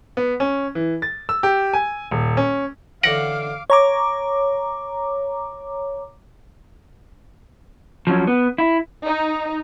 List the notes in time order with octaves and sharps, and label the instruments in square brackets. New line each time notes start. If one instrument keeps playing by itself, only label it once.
[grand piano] B3
C#4
E3
A6
E6
G4
G#5
D#1
C#4
[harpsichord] D3 E3 C#4 [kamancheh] F5 D6 [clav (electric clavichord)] F#5 [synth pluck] A#6 D7
[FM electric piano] C#5 A#5 D6
[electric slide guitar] F3 F#3 C#4
B3
E4
[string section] D#4